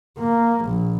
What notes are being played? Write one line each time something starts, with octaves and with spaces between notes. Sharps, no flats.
A#3
A#1